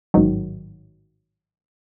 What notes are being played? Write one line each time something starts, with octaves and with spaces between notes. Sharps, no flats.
A1 G#2 D#3 F#3